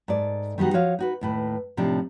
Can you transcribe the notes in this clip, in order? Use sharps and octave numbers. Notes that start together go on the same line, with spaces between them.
G#2 A4 D5
D#3 G3 B3 D#4 F#4
F3 F#4 C#5 F5
D#4 F#4 B4
D#2 A2 B4
A2 C3 F3 D4 D#4